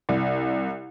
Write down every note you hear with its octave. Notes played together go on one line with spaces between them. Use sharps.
C2